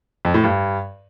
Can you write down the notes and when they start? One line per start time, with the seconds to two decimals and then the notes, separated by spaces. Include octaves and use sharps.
0.25 F2
0.34 A2
0.44 G2